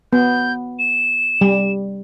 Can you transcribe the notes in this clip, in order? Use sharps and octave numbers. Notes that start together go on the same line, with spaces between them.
B3 G6
E7
G3